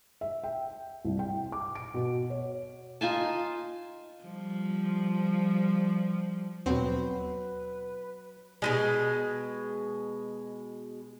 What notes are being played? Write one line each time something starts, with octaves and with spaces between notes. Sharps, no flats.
E5
G5
C2
G5
D6
D7
B2
C#5
D#4 F4 G#5 A5
F3 G3
D#2 B2 F#3 C4 B4
B2 F3 G#3